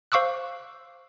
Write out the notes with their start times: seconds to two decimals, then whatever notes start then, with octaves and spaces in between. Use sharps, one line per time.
0.12 C5 F5 C#6 D6 E6 F#6